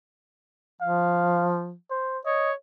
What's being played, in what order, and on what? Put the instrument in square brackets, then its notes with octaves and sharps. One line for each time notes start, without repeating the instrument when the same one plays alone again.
[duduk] F3 [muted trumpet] F5
[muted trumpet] C5
[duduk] C#5 [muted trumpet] D#5